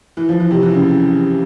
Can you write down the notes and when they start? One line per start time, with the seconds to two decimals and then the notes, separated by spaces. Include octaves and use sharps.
0.17 E3
0.29 F3
0.40 E3
0.51 C3
0.63 E3
0.74 C#3